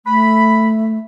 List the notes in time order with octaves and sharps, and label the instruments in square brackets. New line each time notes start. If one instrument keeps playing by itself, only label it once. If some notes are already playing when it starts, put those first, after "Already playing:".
[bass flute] A3 [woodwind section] B5